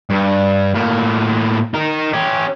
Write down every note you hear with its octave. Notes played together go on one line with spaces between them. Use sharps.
G2
A2 A#3
D#4 A#4
C#4 G4